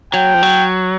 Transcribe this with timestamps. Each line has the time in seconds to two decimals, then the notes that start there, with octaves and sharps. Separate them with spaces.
0.14 F#3 G5
0.34 F3
0.43 F#3